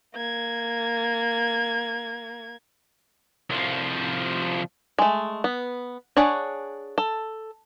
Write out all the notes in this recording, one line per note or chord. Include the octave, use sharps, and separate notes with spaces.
A#3 G#6
C2 F3
G#3 A3
B3
D4 G#4 C#5 F#5
A4